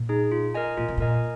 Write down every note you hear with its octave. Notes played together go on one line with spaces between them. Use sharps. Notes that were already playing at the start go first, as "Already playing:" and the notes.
Already playing: A#2
D#4 G#4
F4
A#4 D#5 G#5
A#2 F4
C3
A#2 A#4 D#5 G#5